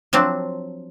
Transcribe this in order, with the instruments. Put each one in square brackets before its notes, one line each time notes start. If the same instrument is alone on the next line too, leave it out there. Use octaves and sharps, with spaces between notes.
[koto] F3 F#3 C4 D4